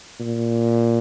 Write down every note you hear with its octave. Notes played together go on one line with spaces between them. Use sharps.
A#2